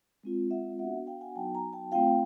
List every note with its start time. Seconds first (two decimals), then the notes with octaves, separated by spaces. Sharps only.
0.23 G#3 C4 F4
0.51 E5 F#5
0.79 B3 D4 F#4 E5 F#5
1.07 F5 G5
1.21 F#5 G#5
1.36 F#3 B3 D#4 F#4 G5 A5
1.55 G#5 A#5
1.73 G5 A5
1.92 A3 C4 F4 F5 G5